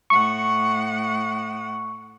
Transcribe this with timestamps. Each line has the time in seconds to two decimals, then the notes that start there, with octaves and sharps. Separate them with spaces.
0.10 A2 F#5 C#6